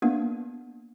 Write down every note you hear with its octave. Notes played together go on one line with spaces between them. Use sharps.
A#3 B3 D4